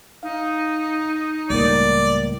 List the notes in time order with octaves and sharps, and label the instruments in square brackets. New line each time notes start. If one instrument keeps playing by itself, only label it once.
[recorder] D#4 [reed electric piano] F5
[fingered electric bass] C#2 A2 [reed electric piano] G3 A#3 A#4 [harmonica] D5